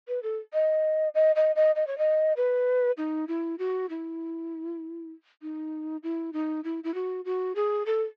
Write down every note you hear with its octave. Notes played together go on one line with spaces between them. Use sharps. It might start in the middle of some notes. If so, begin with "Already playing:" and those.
B4
A4
D#5
D#5
D#5
D#5
D#5
C#5
D#5
B4
D#4
E4
F#4
E4
D#4
E4
D#4
E4
E4
F#4
F#4
G#4
A4